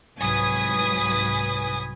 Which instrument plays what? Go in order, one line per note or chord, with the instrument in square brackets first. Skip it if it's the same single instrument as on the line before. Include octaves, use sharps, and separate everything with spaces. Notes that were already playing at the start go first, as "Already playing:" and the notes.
[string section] C2 G#2 F#3 B4 G#5 D#6